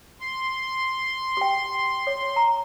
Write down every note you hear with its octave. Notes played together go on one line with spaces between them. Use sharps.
C6
G4 G5
C#5
A#5